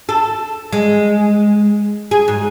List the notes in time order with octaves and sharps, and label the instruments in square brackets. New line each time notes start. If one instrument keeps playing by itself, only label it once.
[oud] A4
G#3
G#4
G#2